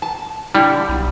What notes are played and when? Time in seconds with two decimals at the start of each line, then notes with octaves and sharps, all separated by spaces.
0.02 A5
0.55 D3 G3 E4
0.88 B1